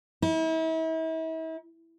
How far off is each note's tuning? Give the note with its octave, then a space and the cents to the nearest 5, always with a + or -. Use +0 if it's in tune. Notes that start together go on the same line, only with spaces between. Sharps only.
E4 -40